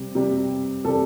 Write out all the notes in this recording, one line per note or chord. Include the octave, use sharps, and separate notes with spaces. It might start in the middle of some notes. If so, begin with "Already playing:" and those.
Already playing: C3 G3
C3 G3
C3 G3 A4